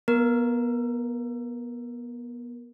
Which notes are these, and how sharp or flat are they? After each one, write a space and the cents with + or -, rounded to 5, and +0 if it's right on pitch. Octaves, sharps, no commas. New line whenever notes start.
B3 -30 A#4 +0